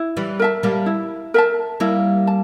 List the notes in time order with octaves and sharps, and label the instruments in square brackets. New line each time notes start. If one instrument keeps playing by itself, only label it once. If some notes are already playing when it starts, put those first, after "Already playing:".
Already playing: [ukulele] E4
[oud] E3 G3
[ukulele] A#4 E5 A5
[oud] G3 A#3
[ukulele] E4
A#4 E5 A5
[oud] G3 A#3 [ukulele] E4
[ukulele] A5